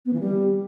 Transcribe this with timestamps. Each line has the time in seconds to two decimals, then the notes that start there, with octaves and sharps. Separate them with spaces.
0.05 B3
0.13 E3
0.20 G3